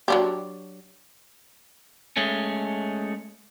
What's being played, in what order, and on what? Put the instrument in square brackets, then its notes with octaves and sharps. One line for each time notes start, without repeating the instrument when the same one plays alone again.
[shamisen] F#3 D4 G4
[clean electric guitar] G#3 A3 C#4